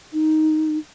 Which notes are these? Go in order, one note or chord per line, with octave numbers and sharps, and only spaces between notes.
D#4